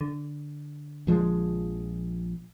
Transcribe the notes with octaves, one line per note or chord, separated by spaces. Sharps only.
D3
A#1 F3 G#3